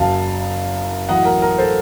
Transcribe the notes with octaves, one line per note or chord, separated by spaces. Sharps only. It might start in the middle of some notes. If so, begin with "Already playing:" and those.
Already playing: F#1 F#2 C#3 F#3 F5 A5
A1 A2 F#3 D#5 F#5
A#4
A#4
A4 C5